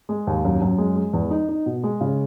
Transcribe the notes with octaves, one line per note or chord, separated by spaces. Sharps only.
G#3
D#2
F#2
F#2
G#3
G#3
E2
D#4
D#4
B2
G#3
C#3